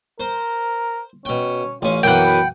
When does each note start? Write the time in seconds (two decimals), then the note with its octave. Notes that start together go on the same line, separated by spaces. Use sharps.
0.20 A#4 C5
1.25 B2 C#4 G5
1.82 A1 C#4 F4
2.03 F#2 B2 E3 A#3 F#5 G5
2.25 B4